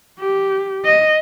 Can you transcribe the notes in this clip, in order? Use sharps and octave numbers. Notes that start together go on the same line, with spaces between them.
G4
D#5